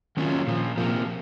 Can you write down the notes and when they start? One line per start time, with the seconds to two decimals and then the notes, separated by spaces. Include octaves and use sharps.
0.17 D#3 F#3 A#3 C#4 F4
0.47 A#2 F3 A#3
0.77 C3 F3 A#3